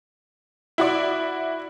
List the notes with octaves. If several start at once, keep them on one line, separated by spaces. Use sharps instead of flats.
E4 F#4 D5